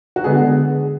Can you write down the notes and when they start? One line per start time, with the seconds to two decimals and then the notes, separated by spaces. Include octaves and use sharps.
0.16 F#4
0.24 D3 G#3 B3 G#4